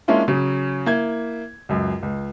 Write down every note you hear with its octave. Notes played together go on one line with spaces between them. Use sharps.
G#3 A#3 C#4 D4 E4 F4
C#3 F#3 C#4 G#4
A#3 E4 G#6
C#2 F#2
C#2